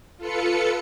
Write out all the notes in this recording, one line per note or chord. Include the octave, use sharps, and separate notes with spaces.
F4 A4 B4 C#7